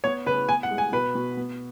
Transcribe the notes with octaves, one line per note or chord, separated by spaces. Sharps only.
B3 C#5 C#6
C#3 B4 B5
B3 G#5
F#5
G#3
G#5
B2 B4 B5
B2
B3